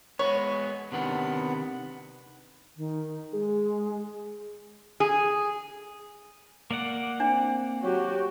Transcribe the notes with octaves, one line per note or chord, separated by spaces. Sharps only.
G#3 B3 C#5
C3 D#3 B3 D4
D#3
G#3 G#4
G#4
A#3 D5 F#5
C4 D4
F#3 F#4 G4